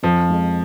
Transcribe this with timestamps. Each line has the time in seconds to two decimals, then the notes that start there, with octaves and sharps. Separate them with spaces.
0.03 F2 F3
0.30 G#3